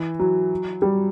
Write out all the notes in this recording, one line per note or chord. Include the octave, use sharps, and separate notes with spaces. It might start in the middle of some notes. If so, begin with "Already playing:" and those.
Already playing: E3
F#3
G3